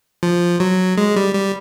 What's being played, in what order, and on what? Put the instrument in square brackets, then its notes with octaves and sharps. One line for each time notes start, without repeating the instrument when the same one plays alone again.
[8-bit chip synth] F3
F#3
G#3
G3
G3